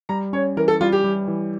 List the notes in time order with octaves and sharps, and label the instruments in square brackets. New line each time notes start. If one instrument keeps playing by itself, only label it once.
[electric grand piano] G3 [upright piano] A#5
[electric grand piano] C#4 [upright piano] C#5
[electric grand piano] E3 [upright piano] A#4
[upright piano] A4
[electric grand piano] G3 [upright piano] F4
[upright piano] G4
[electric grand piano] G3
E3